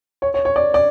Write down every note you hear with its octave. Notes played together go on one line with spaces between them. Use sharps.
C#5
C#5
C#5
D5
D5